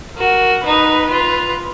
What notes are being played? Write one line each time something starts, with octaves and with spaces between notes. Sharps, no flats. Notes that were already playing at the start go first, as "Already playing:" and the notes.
F#4 A#4
D#4 B4
F4